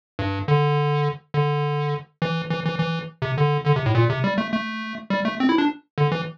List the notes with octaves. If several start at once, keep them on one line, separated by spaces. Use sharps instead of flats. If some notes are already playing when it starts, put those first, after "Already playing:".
G2
D3
D3
E3
E3
E3
E3
C3
D3
D3
C3
A2
A#2
C3
G3
A3
A3
G3
A3
C4
E4
D4
D3
E3